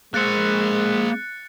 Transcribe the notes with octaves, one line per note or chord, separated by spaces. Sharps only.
G#3 A#3 C5 F#6 A6 C#7